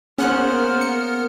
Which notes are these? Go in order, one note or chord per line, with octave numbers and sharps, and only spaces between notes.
A#3 B3 C#4 G#4 C5 F#5 F6 F#6
A#4
C#7